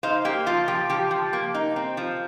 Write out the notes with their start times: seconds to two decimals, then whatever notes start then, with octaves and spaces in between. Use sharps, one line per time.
0.03 D#4 C5 F5
0.25 A#3 G4
0.46 F3 F4
0.68 F3 G4
0.89 F3 G4
1.11 F3
1.33 A#3
1.54 D#4
1.76 C4
1.97 F3